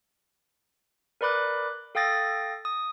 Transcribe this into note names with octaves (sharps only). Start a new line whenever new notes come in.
A#4 B4 D5 B5 D6 F#6
A4 F5 G5 D#6 A6 A#6
D#6